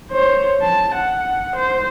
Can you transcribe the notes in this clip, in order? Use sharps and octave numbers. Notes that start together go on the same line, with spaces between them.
C5 C#5
A5
F#5
C5